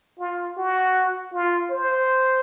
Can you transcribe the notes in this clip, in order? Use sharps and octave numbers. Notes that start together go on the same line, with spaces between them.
F4
F#4
F4
C5